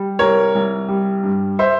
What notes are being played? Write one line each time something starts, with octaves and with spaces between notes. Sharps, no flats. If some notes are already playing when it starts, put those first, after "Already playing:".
Already playing: G3
C2 A#4 C#5
C2
G3
G2
C5 E5